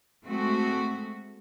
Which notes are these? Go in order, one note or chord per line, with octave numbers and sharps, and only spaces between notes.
G#3 A3 C4 F#4